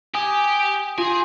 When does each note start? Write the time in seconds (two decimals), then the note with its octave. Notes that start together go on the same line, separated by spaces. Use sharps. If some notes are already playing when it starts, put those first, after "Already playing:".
0.15 G4 G#5 D#6
0.98 F4 G#4 G#5